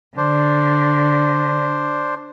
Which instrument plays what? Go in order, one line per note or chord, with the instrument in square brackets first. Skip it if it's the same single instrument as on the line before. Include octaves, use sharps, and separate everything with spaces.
[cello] D3 [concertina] D4 C5